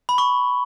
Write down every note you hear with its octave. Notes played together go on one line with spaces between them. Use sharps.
B5
C#6